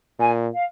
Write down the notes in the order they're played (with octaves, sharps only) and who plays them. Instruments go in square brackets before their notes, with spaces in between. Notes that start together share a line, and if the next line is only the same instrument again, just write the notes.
[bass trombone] A#2 [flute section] G#5
[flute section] F5